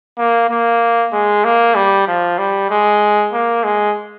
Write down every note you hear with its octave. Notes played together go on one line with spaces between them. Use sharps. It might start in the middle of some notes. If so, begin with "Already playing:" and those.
A#3
A#3
G#3
A#3
G3
F3
G3
G#3
A#3
G#3